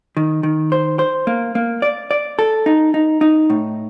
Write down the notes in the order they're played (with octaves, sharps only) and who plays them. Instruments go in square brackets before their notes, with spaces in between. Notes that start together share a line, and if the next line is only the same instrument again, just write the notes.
[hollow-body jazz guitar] D#3
D#3
C5
C5
A#3
A#3
D5
D5
A4
D#4
D#4
D#4
A2